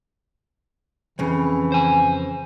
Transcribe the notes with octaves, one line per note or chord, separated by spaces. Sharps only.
F2 C#3 E3
C5 G#5